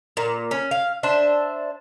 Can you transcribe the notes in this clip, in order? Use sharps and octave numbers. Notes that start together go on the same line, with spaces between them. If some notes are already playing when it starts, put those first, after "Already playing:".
A#2
C#4
F5
D4 C5 E5